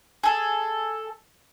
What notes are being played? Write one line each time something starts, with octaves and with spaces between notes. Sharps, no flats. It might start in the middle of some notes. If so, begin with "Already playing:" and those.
G#4 A4